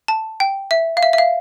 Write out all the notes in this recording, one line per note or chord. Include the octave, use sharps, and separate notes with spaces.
A5
G5
E5
F5
E5
E5
F5